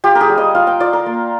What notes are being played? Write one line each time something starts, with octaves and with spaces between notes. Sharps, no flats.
F4 G4
A#4
G#4
G3
D#5
F4 F5
G5
F4 D5
A#4
A#3